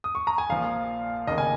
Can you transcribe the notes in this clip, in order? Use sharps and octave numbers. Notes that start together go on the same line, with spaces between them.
D#6
C#6
A#5
G#5
A#1 A#2 F3 F5
F1 D#2 C#3 A#3 D#5
G#5